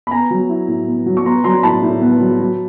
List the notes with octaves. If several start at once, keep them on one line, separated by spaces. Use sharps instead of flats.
B5
B3 G#5 A#5
F#3
E4
A2
B3
F#3
C#6
B3 A#5 C6
F#3 A#5 C6
A2 A5 B5
A2
B3
F#3
F#3